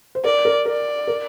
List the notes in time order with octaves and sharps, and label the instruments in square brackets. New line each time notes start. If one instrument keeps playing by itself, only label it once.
[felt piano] C5
[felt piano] A#4 [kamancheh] D5
[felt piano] A#4
[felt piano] A#4 [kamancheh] D5
[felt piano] A#4